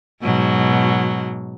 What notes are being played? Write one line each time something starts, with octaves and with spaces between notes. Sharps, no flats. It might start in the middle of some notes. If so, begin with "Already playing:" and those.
G#2 B2 F#3